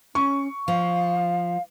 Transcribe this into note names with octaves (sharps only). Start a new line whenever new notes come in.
C#4 C#6
F3 F5